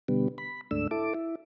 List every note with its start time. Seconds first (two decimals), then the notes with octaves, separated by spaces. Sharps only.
0.08 B2 D3 G3 B3
0.38 B5
0.71 D2 G#2 A3 D4 E6
0.91 E4 A4 D6
1.14 E4